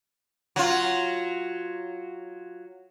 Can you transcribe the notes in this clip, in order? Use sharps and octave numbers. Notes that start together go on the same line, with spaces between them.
F#3 F4